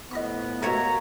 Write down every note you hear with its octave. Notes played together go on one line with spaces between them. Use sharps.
A2 F3 B3 D#5 B5 C#6
B2 A3 A#3 C#5 E5 A#5